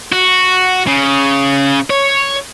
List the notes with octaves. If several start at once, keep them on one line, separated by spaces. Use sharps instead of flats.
F#4
C#3
C#5